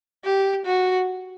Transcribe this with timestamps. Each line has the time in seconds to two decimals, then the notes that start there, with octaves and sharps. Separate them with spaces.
0.25 G4
0.66 F#4